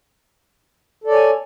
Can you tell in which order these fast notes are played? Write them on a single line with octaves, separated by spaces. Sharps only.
A4 D5 C#5 G#5